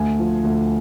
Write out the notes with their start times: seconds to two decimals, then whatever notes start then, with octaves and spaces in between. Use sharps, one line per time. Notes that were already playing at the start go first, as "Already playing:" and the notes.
Already playing: D2 G#5
0.19 F3
0.44 D2